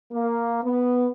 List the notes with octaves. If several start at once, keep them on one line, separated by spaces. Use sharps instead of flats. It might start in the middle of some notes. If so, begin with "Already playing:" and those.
A#3
B3